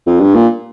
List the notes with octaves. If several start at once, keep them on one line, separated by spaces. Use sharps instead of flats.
F2
G2
A#2